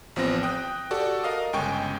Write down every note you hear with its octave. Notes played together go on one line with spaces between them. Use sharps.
A1 F3 B3 C4 A#6
G5 D#6 F#6
F#4 G4 A4 D5
A#4 D#5 F5 D#6
G1 C#3 G#3 G5 G#5 C#6